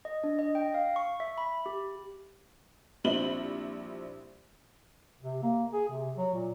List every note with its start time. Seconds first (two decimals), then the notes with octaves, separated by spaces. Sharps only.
0.05 D#5
0.24 D4
0.39 D#5
0.55 G5
0.74 F5
0.96 C#6
1.20 E5
1.38 B5
1.66 G4
3.04 A#1 G3 C4 E4 B5 F#7
5.22 C3
5.42 A#3
5.73 G#4
5.89 C3
6.17 F#3
6.34 A#2